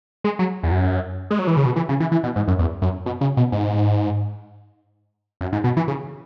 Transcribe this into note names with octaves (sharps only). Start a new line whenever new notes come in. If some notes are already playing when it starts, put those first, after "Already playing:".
G#3
F#3
E2
F#2
G#3
F#3
E3
C#3
B2
E3
C#3
E3
E3
B2
G#2
F#2
E2
F#2
B2
C#3
B2
G#2
F#2
G#2
B2
E3
C#3